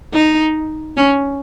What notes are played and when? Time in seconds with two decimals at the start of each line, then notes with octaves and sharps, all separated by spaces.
0.13 D#4
0.97 C#4